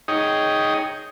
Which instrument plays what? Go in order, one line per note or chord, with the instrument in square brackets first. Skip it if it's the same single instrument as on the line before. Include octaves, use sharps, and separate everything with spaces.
[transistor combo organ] D#4 G#4 C#5 D#5 G5